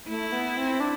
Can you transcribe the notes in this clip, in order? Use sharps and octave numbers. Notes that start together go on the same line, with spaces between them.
A3 E4
B3
C4
D4